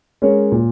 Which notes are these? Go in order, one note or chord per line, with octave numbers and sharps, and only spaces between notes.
G#3 C#4 A#4 C#5
A#2